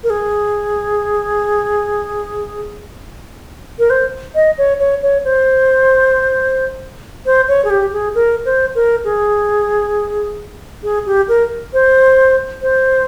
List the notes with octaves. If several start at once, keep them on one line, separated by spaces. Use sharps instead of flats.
A#4
G#4
A#4
C5
D#5
C#5
C#5
C#5
C5
C5
C#5
G#4
G4
G#4
A#4
C5
A#4
G#4
G#4
G4
A#4
C5
C5